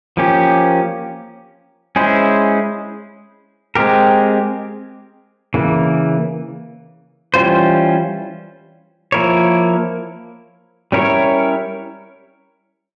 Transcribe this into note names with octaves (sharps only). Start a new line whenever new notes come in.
F3 A#3 C#4 G4
G#3 C#4 E4 G#4 C5
G#3 C4 G4 A#4
C#3 E3 A#3
E3 G3 C#4 F4 C5
F3 A#3 E4 A#4 C#5
G3 C#4 E4 A#4 C#5